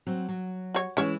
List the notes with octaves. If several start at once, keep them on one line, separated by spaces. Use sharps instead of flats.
F#3 C4
F#3
F#4 C#5
E3 G#3 C#4 E4 C#5